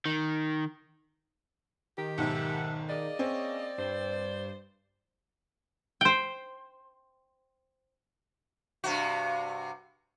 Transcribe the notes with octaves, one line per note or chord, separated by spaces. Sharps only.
D#3
D#3 G4
B1 G#2 A4 E5 F#5
A#3 G#4 D5 D#5
C4 C#4
G2 C5
C5 G5
G2 C3 F#4